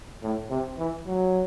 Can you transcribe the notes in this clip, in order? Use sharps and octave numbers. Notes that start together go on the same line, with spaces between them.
A2
C3
E3
F#3